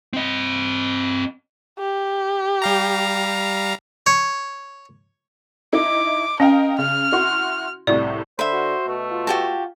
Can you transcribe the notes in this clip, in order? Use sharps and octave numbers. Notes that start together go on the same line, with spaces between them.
C4 D#5
G4
G3 F5 A#5
C#5
D#4 E4 D#5 D6
C#4 A#4 D#5 F5 G5
C#3 F6
E4 F#4 C6
C2 A2 C3 D5
D3 C5 E5 B5
F#4
B2 A3
F4
F#4 G4 A5